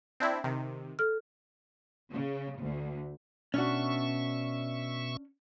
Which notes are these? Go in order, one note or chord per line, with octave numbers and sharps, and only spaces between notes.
C4 D4 E4
C3 D#3
A4 F6
C#3
D2
B2 C#4 D4 F#4 E5 C#6